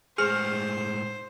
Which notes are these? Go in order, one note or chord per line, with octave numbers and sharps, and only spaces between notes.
A2 G#3 G#4 C5 G#5 F6